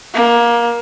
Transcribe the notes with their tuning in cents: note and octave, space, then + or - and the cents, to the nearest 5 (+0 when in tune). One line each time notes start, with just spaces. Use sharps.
A#3 +20